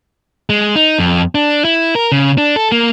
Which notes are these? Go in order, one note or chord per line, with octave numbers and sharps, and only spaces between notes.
G#3
D#4
F2
D4
E4
A#4
C#3
D4
A4
A#3